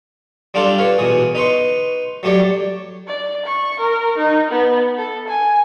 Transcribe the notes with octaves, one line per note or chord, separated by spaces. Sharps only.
G3 D4 F4 G4 A4
B4 C#5 F5
B2 E3 G#4
D#4 B4 C6 C#6
F#3 A3 G4 C#5 D5
D5
C#6
A#4
D#4
B3
A4
G#5